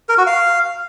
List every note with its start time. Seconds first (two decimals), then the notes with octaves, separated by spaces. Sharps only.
0.09 A#4
0.18 F#4
0.27 F5